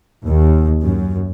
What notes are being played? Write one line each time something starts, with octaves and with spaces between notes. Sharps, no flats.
D#2
F#2